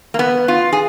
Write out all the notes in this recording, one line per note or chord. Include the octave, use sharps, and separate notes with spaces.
A#3
B3
F4
G#4